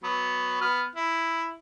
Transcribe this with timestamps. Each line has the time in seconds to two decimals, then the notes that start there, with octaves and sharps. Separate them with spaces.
0.04 F#3 B3
0.61 B3 F6
0.96 E4